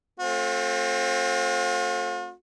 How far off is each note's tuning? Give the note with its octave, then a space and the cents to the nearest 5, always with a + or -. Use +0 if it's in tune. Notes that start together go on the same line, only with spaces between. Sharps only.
A3 +0 C4 +25 F4 +45